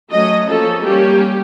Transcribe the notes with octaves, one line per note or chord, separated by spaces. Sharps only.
F#3 A3 C#4 D#5
F3 A#3 C#4 A4
G3 A#3 C#4 G4